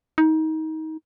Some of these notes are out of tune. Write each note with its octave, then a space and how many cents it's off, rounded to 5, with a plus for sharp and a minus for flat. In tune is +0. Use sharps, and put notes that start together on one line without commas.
D#4 +25